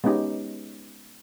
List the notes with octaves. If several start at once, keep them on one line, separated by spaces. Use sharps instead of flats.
G#3 B3 C#4 D#4 G4